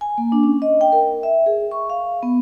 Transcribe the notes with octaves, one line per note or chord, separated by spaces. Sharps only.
G#5
A#3
D4
C#4
D#5
G5
A#4
E5
G#4
C#6
F5
B3